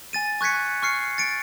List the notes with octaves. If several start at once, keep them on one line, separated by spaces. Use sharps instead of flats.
G#5 A6 D#7
C#6 F#6 G#6 B6 C#7
C#6 F6 C7 C#7
A6 C#7 D7